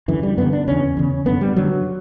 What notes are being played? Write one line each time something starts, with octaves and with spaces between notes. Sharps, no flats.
F#2 D3 E3
G3
F#2 D3 B3
D4
E2 C#3 C#4
E2 C#3
F#2 D3 B3
G3
F#2 D3 F#3